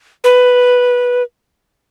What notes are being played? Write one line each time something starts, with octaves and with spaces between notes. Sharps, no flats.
B4